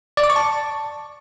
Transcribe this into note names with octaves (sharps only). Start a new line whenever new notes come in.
D5
D6
C#6
A5